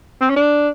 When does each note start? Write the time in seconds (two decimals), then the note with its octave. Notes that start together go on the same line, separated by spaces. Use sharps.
0.21 C4
0.30 C#4
0.36 D4